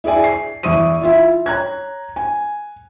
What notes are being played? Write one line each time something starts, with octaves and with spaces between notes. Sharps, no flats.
E4 G#4 D5 G#5
C7
E2 E4 C#6 D#6 D#7
E4 F4 E5
C#5 A#5 F#6 G#6
G#5